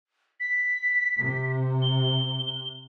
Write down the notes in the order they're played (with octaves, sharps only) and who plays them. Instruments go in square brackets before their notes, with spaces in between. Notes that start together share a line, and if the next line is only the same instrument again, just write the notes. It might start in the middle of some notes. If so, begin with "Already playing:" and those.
[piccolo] B6
[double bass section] C3
[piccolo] G7